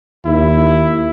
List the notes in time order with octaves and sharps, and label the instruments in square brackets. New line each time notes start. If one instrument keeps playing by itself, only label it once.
[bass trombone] D#2 [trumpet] E4